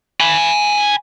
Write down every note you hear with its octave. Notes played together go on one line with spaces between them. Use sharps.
G#5 B5